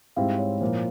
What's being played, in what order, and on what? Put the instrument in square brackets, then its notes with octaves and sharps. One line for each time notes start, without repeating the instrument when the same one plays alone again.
[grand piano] G#2 G3 C4 E4 [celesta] F5
[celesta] C#5
[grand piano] A#2 F3 A#3 E4 [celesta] C5